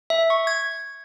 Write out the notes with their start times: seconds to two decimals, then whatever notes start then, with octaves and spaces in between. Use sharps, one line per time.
0.10 E5
0.30 C#6
0.47 G#6